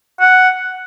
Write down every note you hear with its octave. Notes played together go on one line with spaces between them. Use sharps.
F#5